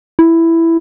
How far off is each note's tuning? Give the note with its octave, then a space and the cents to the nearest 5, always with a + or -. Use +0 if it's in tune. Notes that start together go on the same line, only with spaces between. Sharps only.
E4 +5